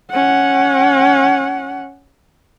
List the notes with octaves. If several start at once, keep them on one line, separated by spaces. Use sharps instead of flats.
C#4 F#5